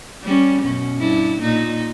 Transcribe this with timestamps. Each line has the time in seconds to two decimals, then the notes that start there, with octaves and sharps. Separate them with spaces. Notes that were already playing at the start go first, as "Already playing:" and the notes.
0.23 G3 C#4
0.63 F#2 B2 C#4
0.97 G2 E4
1.42 A#2 D#4